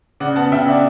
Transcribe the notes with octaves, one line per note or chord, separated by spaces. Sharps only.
C#3 D5 F#5
B3 F#5 A5
C#3 E5 G5
D4 D5 F#5